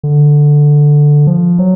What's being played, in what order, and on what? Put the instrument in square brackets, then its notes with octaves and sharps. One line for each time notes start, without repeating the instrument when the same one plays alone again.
[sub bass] D3
F3
F#3